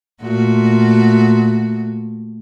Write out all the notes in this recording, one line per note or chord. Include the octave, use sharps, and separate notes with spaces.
A#2 A3 F#4